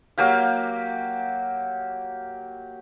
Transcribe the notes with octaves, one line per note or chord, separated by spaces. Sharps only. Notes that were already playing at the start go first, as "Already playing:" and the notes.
F#3 A#3 G4 F5